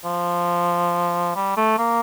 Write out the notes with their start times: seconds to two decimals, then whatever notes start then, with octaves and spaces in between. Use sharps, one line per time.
0.05 F3
1.36 G3
1.57 A3
1.79 A#3